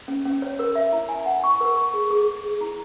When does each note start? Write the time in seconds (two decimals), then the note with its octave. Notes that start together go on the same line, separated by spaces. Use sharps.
0.08 C#4
0.25 C#4
0.42 C#5
0.59 A#4
0.75 E5
0.92 E4
1.09 G#5
1.26 F#5
1.44 C#6
1.61 A#4
1.77 C#6
1.94 G#4
2.10 G#4
2.28 G#4
2.44 G#4
2.61 E4